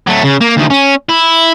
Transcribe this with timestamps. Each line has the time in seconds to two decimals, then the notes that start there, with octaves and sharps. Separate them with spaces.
0.07 F#3 A3
0.24 C#3
0.41 A#3
0.57 D2 D#3
0.70 C#4
1.09 E4